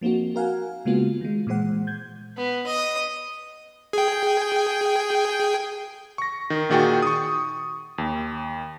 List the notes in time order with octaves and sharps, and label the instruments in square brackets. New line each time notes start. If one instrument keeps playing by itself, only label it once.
[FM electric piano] F3 A#3 C4 D#4 F#4
F#4 A#4 F5 F#5 G#5
C#3 G#3 A#3 B3 F4 F#4
D#3 G#3
A#2 E3 G#3 C5 F#5
G6 G#6
[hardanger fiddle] B3
D#5
[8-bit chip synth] G#4 G5
[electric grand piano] C#6 A#6
D#3
A#2 D#3 F#4 G#4 G5 A6
C#6 D#6
D#2